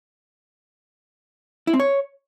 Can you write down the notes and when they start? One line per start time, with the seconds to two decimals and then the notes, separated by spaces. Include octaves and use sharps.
1.67 E4
1.73 C4
1.80 C#5